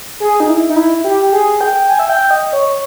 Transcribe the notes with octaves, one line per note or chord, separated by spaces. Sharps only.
G#4
D#4
E4
D#4
E4
G4
G#4
G5
G#5
E5
G5
D#5
C#5